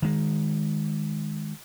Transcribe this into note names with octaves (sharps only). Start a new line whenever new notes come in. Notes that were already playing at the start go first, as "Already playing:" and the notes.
D#3 G#3